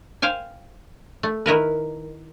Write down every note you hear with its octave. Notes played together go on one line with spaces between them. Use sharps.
C5 F5 G5 G#5
A3
D#3 E4 A#4 B4